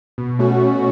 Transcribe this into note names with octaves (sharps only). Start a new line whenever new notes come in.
B2
A3 C#4 F#4
B2